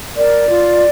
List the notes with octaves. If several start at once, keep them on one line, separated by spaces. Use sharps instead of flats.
A#4 D5
F4